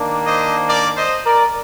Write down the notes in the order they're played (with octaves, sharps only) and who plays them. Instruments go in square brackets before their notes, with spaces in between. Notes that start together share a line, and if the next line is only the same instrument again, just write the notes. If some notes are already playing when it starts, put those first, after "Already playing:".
Already playing: [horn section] D#3 A#3 D4
C5 D#5
A#4 D5
C5 D#5
A#4 D5